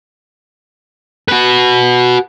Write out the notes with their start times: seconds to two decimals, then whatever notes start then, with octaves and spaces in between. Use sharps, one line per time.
1.28 F#4 B4